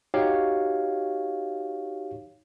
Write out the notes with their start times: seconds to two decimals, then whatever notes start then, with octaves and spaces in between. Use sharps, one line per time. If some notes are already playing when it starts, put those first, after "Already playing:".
0.14 D#4 F#4 G4 C#5 F5